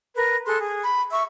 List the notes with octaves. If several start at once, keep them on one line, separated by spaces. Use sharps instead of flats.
A#4 B4
G#4 A4 C6 F#6
G#4
B5
E5 C#6 E6